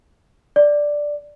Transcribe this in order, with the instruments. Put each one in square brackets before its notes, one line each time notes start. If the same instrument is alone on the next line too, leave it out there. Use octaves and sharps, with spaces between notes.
[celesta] D5